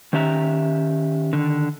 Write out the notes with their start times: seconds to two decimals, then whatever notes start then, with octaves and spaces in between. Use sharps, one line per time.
0.13 D#3 C#4 G4 E5 A#5
1.33 D3 D#3